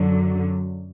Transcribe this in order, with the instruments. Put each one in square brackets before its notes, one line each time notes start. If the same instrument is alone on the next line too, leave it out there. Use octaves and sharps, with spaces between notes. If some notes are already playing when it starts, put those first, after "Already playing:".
Already playing: [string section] F#2 D3 F#3